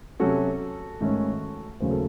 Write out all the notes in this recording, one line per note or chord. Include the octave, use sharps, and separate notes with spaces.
C3 F#3 C#4 F#4 A4
G#2 D#3 A3 C#4
D#2 C#3 F#3 A3 C#4 C5
A4